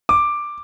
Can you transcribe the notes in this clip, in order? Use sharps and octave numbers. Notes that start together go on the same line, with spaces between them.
D6